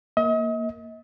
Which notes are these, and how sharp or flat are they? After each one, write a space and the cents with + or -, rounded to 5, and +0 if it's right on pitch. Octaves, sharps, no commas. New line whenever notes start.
A#3 +0 D#5 +40